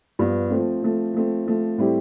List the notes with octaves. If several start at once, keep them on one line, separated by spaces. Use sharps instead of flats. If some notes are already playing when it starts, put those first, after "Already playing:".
G2 F3 B3
F3 A3 C4
F3 A3 C4
F3 A3 C4
F3 A3 C4
A2 G3 C4 E4 G4